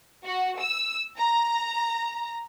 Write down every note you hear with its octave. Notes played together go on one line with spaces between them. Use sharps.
F#4
E6
A#5